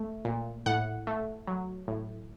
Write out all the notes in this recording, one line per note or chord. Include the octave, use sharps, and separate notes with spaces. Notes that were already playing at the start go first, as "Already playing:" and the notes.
Already playing: A3
A#2
A2 F#5
A3
F#3
A2